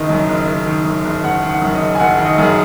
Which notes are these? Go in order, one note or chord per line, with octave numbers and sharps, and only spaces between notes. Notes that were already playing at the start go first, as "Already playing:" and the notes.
Already playing: F#1 D#3 D#5
F#2
F#1
F#1
D#3
F#2
F#1
F#1 F#5
D#3
F#5
F#2
D#5
F#1
G#5
F#1 F#5
D#3
D#5
F#2 G#4